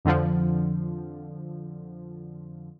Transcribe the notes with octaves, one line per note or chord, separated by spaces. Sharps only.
F2 D3 F3